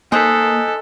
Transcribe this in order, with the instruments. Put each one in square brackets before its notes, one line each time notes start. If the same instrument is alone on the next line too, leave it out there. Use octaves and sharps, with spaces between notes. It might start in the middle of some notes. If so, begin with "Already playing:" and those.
[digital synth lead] A#3 [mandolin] D#4 C5 D#5 [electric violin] A4 [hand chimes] G#5 F#6 B6